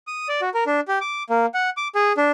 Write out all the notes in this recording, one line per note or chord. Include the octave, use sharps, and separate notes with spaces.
D#6
D5
F#4
A#4
D4
G4
D6
A#3
F#5
D6
G#4
D4